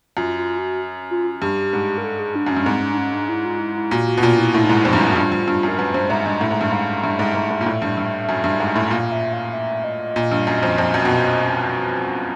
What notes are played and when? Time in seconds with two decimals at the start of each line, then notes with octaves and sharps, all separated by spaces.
0.17 F#2 F4
0.37 F4
0.58 F#4
1.11 F4
1.42 G2 G4
1.73 G#2
1.98 A#4
2.04 A4
2.20 G#4
2.35 D4
2.47 F#2 C#4
2.57 G2
2.66 G#2 C4
2.82 C#4
2.91 D4
2.98 C#4
3.13 D4
3.29 E4
3.45 F4
3.60 E4
3.76 E4
3.91 A#2 F#4
4.07 F#4
4.17 B2
4.22 A#2 F4
4.38 E4
4.54 A2 E4
4.63 D#4
4.69 G#2 E4
4.85 F2 D#4
4.93 G2
5.01 F#2 E4
5.12 F#4
5.16 G2 F4
5.32 G2
5.48 G2
5.63 F#2 A#4
5.79 F#2 B4
5.94 G2 C5
6.10 G#2 E5
6.26 G2 D#5
6.41 A2 E5
6.51 G#2
6.61 G2
6.71 G#2 F5
7.03 G2 E5
7.19 G#2
7.35 G#2
7.51 G#2
7.61 A#2
7.66 A2
7.82 G2
7.98 G2
8.29 F#2
8.44 G2
8.60 G#2
8.75 A2
8.91 A#2 F5
9.12 E5
9.33 F5
9.53 E5
9.84 D#5
10.16 A#2
10.32 G2
10.47 F#2
10.63 F2
10.78 F2
10.94 F#2
11.05 B2